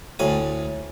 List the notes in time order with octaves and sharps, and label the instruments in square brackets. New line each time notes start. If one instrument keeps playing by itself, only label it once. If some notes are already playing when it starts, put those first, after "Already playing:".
[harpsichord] D2 A2 G#5